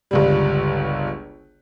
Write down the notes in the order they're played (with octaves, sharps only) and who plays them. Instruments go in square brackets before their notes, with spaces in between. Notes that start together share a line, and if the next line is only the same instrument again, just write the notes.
[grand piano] G1 C#2 G3